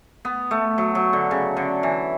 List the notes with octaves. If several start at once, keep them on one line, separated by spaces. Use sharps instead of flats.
B3
A3
F#3
F#3
D3
C#3
D3
E3